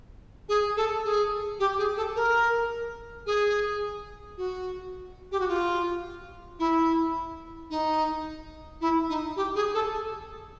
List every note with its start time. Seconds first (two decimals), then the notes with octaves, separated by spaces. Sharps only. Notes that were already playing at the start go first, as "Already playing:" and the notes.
0.49 G#4
0.76 A4
1.05 G#4
1.59 G4
1.78 G#4
1.96 A4
2.15 A#4
3.26 G#4
4.37 F#4
5.32 G4
5.40 F#4
5.48 F4
6.59 E4
7.70 D#4
8.81 E4
9.09 D#4
9.36 G4
9.55 G#4
9.74 A4